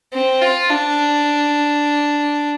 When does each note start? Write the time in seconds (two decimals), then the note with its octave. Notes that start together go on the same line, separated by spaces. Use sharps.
0.14 C4
0.42 F4
0.70 D4